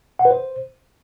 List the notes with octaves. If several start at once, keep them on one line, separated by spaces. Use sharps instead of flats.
F#5
B4
C5